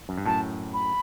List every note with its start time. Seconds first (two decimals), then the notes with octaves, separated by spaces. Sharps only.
0.09 F#2
0.18 G2
0.26 F#2 A2 A5
0.74 B5